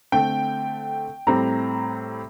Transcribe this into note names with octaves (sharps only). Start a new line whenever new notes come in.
D3 A3 C4 G5
A2 G3 C4 A#5